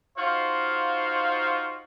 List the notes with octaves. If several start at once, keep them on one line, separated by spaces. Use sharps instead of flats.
D#4 F4 F#4 C5 F5